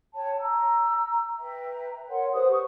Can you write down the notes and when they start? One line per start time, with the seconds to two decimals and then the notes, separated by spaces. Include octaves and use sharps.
0.15 C#5 G5 A5
0.38 A#5 E6
1.39 B4 E5 G5 A#5
2.09 A#4 C#5 F#5 C6
2.33 G4 B4 C5 D#6
2.52 C#6